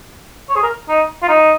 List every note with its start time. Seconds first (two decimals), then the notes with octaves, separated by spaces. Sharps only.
0.49 C#5
0.55 G#4
0.63 A#4
0.89 D#4
1.22 F4
1.28 D#4